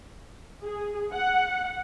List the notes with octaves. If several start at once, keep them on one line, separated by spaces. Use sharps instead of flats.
G#4
F#5